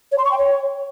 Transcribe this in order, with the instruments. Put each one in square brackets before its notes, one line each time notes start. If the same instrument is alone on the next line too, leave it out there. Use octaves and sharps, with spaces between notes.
[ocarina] C#5
C6
C#6
G5
C#5